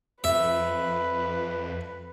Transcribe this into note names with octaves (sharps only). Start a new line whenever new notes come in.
F2 B4 E5